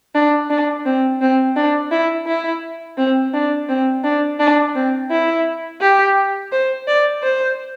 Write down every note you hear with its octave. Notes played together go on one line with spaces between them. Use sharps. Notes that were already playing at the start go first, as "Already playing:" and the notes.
D4
D4
C4
C4
D4
E4
E4
C4
D4
C4
D4
D4
C4
E4
G4
C5
D5
C5